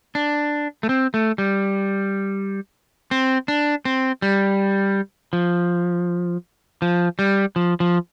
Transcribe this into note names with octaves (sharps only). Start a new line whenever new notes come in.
D4
A3
C4
A3
G3
C4
D4
C4
G3
F3
F3
G3
F3
F3